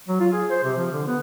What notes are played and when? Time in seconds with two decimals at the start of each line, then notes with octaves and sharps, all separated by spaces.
0.08 F#3
0.20 F4
0.33 G#4
0.50 C5
0.63 C3
0.77 F3
0.92 D3
1.07 B3